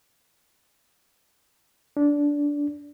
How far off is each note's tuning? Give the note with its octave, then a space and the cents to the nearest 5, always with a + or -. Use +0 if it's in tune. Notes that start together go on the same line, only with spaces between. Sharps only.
D4 -15